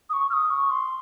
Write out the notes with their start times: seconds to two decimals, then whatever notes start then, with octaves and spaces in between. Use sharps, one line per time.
0.10 D#6
0.13 C#6
0.30 F6
0.33 D#6
0.50 C#6
0.71 C6